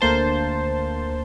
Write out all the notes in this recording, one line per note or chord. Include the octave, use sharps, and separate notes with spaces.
D2 A#3 C5 A5